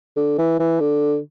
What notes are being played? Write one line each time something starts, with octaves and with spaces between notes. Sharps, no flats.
D3
E3
E3
D3